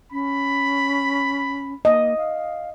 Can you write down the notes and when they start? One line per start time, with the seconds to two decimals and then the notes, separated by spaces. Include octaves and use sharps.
0.12 C#4 B5
1.85 A#3 D#5
2.18 F5